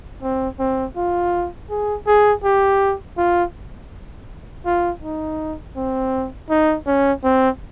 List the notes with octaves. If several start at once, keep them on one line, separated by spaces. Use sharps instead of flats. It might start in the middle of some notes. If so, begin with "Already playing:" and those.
C4
C4
F4
G#4
G#4
G4
F4
F4
D#4
C4
D#4
C#4
C4